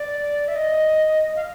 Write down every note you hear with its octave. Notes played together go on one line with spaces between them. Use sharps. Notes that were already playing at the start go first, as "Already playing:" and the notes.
Already playing: D5
E5
D#5
F5